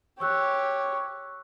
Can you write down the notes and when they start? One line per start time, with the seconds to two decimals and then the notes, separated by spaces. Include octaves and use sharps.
0.20 G4 C#5 C#6 E6 F#6